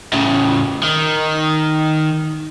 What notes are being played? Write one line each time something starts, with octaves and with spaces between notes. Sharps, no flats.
A2 C#3
D#3